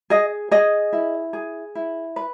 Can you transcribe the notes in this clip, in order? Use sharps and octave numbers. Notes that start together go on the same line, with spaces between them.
G#4 D#5
G#4 D#5
E4
G#4
E4
B4